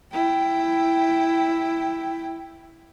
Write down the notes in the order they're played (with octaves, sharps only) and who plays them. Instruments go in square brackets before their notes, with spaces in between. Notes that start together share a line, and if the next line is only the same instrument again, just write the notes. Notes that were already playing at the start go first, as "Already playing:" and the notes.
[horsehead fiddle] E4 G5